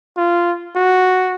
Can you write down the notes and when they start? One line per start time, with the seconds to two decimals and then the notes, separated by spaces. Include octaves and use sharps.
0.17 F4
0.76 F#4